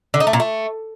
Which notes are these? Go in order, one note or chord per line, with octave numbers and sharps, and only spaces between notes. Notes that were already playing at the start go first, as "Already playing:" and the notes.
D3
D#4
A3
A#2
A3